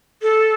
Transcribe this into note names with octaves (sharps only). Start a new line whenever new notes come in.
A4